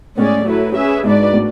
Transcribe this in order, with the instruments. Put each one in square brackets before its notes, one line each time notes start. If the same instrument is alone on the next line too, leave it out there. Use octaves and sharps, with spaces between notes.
[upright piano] A2 [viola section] G#3 C#4 G#4 D5
[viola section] F#3 A3 E4 B4
C#4 G#4 B4 E5
[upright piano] G#2 [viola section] D4 F#4 B4 D5
[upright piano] A2